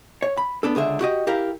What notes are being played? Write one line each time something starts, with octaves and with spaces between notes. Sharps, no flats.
C#5
B5
B3 D4 A4
C#2 D3 G#4 E5
F#4 G4 D#5
E4 G4 A#4 F5